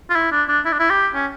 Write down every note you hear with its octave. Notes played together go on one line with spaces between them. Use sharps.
F4
E4
D4
D4
E4
D4
E4
G4
C#4